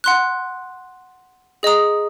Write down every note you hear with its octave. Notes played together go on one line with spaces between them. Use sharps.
F#5 C6 F#6
G#4 D#5 A#5 D#6